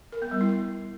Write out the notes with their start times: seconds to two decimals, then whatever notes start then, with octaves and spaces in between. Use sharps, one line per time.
0.12 A#4
0.22 B3
0.31 G3
0.41 E4